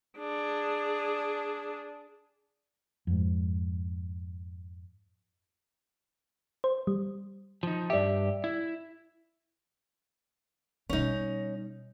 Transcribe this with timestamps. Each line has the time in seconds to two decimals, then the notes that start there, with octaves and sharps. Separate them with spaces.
0.19 D4 G#4
3.07 F2 G#2
6.64 C5
6.87 G3
7.63 F3 D#4
7.90 G2 G4 D5 E5
8.44 E4
10.89 B2 G3 C#4 D#4